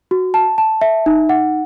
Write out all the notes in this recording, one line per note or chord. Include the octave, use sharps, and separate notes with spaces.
F#4
A5
A5
E5
D#4
F#5